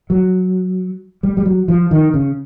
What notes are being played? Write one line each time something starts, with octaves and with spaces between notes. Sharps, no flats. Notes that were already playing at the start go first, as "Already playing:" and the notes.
F#3
G3
G3
F#3
F3
D#3
C#3